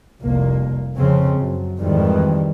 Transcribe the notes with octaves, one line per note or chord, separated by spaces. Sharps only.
F1 C2 A#3
F2 C#3 F3 C4 C#4
F#2
F2 G#2 D#3 E3 G3